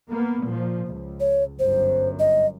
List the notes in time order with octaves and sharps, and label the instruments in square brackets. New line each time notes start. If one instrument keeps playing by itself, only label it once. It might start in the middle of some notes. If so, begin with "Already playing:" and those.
[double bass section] A#3 B3
A#2 F3
C#2
[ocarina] C#5
[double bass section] G1 F#2 [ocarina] C5
[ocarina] D#5